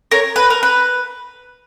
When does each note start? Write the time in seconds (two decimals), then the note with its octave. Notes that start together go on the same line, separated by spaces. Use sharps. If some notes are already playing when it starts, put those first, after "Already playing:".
0.11 A#4 C#5
0.36 B4
0.50 A#4
0.63 B4